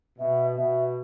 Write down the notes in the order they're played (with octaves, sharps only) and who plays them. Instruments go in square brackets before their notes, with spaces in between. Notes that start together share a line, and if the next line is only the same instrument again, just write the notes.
[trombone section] B2 [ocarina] E5
[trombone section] B2 [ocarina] E5